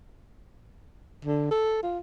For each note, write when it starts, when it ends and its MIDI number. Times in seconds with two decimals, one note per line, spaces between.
1.25 1.50 50
1.51 1.81 69
1.82 1.99 65